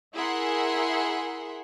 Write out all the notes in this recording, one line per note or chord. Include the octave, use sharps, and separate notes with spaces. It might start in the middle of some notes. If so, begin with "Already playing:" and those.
E4 G#4 A#4 E5 F#5 C6